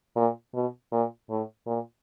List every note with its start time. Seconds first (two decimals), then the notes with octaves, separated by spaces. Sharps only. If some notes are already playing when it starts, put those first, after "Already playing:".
0.16 A#2
0.54 B2
0.92 A#2
1.30 A2
1.67 A#2